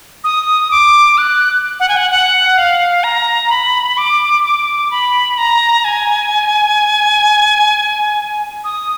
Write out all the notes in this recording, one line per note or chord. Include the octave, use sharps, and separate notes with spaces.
D#6
D6
F#6
F#5
G#5
F#5
F#5
F5
A#5
B5
D6
D6
B5
A#5
G#5
D#6